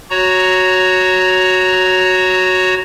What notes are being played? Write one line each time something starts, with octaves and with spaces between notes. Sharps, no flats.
F#4 C#5 A#5